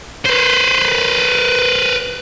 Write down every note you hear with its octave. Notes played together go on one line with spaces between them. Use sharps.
B4 C5